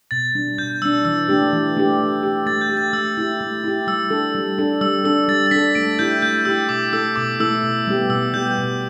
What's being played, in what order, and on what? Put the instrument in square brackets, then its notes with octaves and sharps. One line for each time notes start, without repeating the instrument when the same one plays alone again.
[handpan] B2 [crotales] A6
[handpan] G3 D4
[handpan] B2 [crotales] G6
[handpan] G3 D4 [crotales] E6
[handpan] E3 [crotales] E6
[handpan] A3 D4 G4
E3
A3 D4 G4
A3
G4
[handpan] A3 [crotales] A6
[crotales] G6
[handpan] G4
[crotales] A6
[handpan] A3 [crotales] E6
[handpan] E4 G4
A3
E4 G4
[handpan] G3 [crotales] E6
[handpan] D4 A4
G3
D4 A4
[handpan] G3 [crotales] E6
[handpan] D4 A4 [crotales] E6
[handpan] G3 [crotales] A6
[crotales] A6
[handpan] D4 A4 [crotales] B6
[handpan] A3 [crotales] D7
[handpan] E4 G4 [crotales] G6
[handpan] A3 [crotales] G6
[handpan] E4 G4 [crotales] E6
[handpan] B2 [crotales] D6
[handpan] A3 E4 A4 [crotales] E6
[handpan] B2 [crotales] D6
[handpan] A3 E4 A4 [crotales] E6
[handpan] B2
G3 B3 G4
[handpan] B2 [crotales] E6
[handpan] G3 B3 G4 [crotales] G6
[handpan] B2